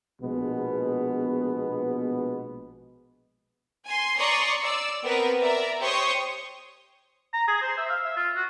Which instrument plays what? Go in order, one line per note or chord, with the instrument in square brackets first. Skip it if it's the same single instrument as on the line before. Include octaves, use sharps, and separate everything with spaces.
[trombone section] A#1 B2 G#3 B3
[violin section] G#5 C6
C#5 D5 A#5 C6 C#6 D#6
D5 E6
B3 C4 A#4 B4
A#4 D5 E5 A#5
G4 C5 C#5 C6 C#6 D#6
[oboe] A#5
G#4
C5
E5
F5
E5
F4
F#4